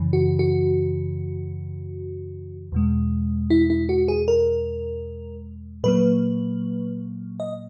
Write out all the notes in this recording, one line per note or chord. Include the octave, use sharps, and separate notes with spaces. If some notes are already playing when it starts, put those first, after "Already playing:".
Already playing: F#2 C#3 E3
F#4
F#4
E2 B2 G#3
E4
E4
F#4
G#4
A#4
A#2 F#3 A#3 B4
D#5